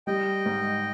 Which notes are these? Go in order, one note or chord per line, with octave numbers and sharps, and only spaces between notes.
G3 D#5 G5
G#2